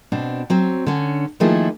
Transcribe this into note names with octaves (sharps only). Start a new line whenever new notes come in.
B2 C4 D4
F#3 C4
D3 C#4
D#3 F3 A3 A#3 E4 G#4